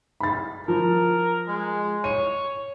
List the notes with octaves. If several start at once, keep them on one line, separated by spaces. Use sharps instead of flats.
B5 A6
F3 A#4
G#3
C#5 D#7